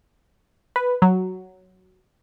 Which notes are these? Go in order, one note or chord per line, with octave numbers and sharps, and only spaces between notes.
B4
F#3